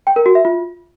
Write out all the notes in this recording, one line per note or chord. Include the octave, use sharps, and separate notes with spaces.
G5
A#4
F#4
E5
F4